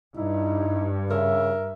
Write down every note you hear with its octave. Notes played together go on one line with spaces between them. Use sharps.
G2 D#4 E4
C#3 A#4 E5